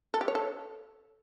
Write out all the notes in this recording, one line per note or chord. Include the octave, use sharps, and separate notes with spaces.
A4
G4
C#5
A4